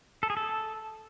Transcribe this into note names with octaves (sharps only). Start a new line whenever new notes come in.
A4
G#4
A4